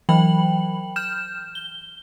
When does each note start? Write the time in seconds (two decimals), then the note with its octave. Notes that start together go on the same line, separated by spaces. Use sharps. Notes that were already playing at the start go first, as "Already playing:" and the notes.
0.09 E3 F#3 G5 B5 F#7
0.96 F6 G6 E7
1.55 G7